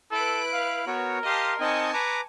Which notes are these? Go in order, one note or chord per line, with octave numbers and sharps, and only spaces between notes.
E4 A4 B4 F#6 D7
F5
B3 F#4 A#4 C#5
G4 D#5 F5 A5 C6
C4 D#4 D#5 G#5 A5 C#6
B4 A#5 D6